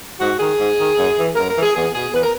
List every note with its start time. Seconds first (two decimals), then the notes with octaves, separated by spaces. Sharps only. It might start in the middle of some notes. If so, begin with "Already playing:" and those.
0.20 G#2 F#4
0.39 D#3 G#4
0.59 G#2
0.78 D#3
0.98 F#2
1.17 E3
1.36 F#2 A#4
1.49 A#4
1.55 E3
1.62 G#4
1.75 E2 G#4
1.94 B2 G#4
2.13 E2 B4
2.23 A#4